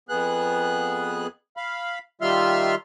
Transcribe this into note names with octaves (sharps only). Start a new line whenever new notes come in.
F2 B3 G#4 F#6
F5 B5
D#3 G3 F4 E5 C6 F6